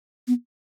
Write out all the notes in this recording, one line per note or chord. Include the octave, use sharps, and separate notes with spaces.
B3